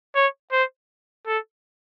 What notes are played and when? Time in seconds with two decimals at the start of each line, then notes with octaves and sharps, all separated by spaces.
0.15 C#5
0.52 C5
1.27 A4